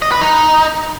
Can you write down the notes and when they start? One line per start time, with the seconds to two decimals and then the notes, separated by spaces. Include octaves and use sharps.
0.02 D#5
0.12 B4
0.21 D#4